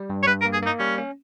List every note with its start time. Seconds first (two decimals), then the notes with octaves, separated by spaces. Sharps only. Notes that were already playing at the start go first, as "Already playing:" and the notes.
Already playing: G3
0.10 G2
0.23 C#5
0.27 G2 B4
0.41 A#4
0.45 A#3
0.53 G#4
0.63 A#3 D#4
0.79 G3 C#4
0.98 C#4